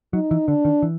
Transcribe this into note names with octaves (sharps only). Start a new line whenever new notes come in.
F#3 D#4
E3
D3 D4
D#3
E3